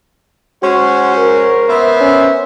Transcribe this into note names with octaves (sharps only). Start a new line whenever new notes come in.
G#3 C#4 F#4 C5
A#4
B3 C5 E5
C#4